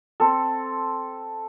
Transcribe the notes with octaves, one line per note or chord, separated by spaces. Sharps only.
C4 A4